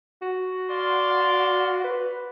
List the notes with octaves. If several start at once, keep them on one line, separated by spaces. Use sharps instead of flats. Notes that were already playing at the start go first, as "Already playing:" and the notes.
F#4
D5 F5 C6
B4